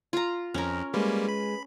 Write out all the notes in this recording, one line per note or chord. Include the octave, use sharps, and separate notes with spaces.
F4 A#5
F2 C#4 A#4
G3 G#3 A#3 B4
B5